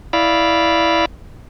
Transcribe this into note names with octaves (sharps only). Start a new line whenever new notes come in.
E4 D5 F5 B5